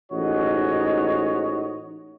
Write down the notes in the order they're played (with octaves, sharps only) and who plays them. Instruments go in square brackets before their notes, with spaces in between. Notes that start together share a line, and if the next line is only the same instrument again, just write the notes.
[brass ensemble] A1 G#2 D#4 F#4 C#5 D#5